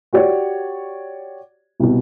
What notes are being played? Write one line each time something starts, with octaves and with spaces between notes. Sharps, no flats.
F#4 G4 C#5 D5
C2 B2